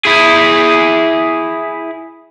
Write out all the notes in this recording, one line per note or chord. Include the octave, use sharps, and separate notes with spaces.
E4 G#4